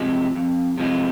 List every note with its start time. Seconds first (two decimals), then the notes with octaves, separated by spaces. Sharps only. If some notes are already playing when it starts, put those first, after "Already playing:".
Already playing: C3 F3 G#3
0.35 F2
0.78 C3 F3 G#3